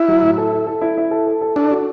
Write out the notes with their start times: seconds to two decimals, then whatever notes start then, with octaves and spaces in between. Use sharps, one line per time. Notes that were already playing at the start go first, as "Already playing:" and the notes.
Already playing: E4
0.08 F#3
0.22 A2
0.37 A4
0.52 A4
0.67 A4
0.81 E4
0.97 E4
1.11 A4
1.27 A4
1.41 A4
1.56 D4 A4
1.71 F#4